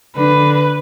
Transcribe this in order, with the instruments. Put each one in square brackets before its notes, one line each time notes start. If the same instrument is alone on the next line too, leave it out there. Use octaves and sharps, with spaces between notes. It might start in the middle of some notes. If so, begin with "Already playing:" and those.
[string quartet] D3 [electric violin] B4